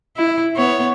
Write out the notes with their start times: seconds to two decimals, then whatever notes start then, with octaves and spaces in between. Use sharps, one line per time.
0.17 E4
0.57 B3 C#5